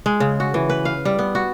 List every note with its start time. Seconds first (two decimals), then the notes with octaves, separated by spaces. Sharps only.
0.06 G#3
0.20 C#3
0.40 F#4
0.54 E3
0.70 B4
0.85 F5
1.05 G3
1.19 B3
1.35 F#4